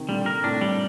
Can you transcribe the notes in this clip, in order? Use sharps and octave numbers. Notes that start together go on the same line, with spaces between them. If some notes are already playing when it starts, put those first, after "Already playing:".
Already playing: C3 D#3
A#2 D3 G3
A#4
A2 C3 D4
G3